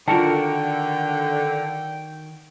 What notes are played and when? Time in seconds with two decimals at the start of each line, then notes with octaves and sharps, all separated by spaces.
0.08 D3 D#3 F4 F#4 A#4 G5 A5